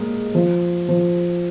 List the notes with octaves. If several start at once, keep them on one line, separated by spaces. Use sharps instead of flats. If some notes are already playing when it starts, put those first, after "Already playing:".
Already playing: G#3 A#3
F3
F3